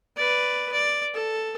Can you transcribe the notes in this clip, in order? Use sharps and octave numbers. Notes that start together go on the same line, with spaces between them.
B4 D5
D5
A4